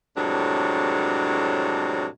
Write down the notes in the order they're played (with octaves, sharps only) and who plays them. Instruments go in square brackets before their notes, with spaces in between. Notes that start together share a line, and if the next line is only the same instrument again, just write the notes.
[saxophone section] F2 A2 C3 F#3 G#3 D4